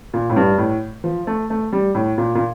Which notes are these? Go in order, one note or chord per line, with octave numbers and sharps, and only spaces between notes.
A#2
A2
G2
A2
F3
A3
A3
G3
A2
A#2
A#2